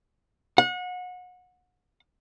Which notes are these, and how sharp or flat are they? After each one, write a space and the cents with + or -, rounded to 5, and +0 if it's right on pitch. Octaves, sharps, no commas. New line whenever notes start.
F#5 -30